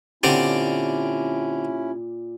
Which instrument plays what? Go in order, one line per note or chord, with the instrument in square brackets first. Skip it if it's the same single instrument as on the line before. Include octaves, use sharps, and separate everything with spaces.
[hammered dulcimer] A#2 D6 [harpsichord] D3 C4 D5 [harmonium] C#4 E4 [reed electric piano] G4